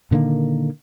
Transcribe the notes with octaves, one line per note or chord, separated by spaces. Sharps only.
A#2 D3 D#3 A#3